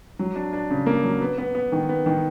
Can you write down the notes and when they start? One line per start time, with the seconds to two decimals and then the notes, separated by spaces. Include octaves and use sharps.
0.19 F#3
0.36 D4
0.53 D4
0.70 C#3
0.86 A#3
1.04 F#3
1.21 B3
1.38 B3
1.55 B3
1.72 D#3
1.89 B3
2.06 D#3